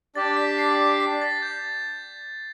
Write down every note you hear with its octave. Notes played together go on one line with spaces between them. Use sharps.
D4 G4 D5 A5 A6
B6
C7
C7
B6
A6
G6